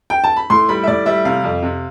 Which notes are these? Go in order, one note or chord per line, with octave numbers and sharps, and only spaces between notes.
G5
A5
B5
A2 C6
G3 B5
E5
A2 D5
G3 E5
C3 F5
F2
C3